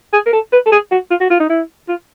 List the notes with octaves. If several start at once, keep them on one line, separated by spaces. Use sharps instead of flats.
G#4
A#4
A4
B4
A4
G#4
F#4
F4
F#4
F4
D#4
E4
F4